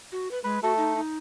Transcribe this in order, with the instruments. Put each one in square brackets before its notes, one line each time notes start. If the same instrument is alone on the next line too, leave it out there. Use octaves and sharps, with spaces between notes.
[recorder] F#4
B4
[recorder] G#3 [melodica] B4
[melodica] A3 A4 [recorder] F#4
[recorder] D#4
D#4